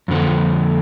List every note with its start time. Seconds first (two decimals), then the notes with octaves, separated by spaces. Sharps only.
0.08 F2 D3 F3